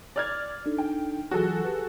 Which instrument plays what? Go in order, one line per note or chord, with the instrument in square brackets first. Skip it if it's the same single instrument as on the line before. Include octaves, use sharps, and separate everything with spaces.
[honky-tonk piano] D5 F6 G#6
[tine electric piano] D4 D#4 A4
[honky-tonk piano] G5
[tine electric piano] E3 F#3 F4 [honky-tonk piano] F#4 G#4 A4
[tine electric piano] G4 B4